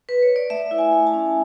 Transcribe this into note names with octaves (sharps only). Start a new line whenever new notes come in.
B4
C#5
D5
A3 E5
E4
G#5
A3
A5
C#4